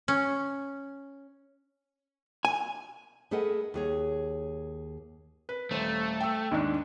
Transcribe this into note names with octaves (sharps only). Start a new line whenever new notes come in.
C#4
G#5
A3 G#4 A#4 B4 D#5 F#5
D#2 G#4 C#5
B4
D#1 A3 C5 D#7
G5 E6
D#2 G#2 D4